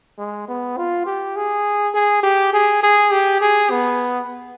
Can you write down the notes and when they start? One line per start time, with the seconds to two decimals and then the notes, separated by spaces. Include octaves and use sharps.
0.18 G#3
0.48 B3
0.77 F4
1.06 G4
1.36 G#4
1.94 G#4
2.23 G4
2.53 G#4
2.83 G#4
3.11 G4
3.41 G#4
3.70 B3